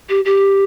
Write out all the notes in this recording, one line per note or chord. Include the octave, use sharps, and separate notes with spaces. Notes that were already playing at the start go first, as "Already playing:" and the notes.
G4
G4